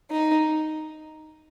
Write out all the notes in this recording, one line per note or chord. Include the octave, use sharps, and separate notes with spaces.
D#4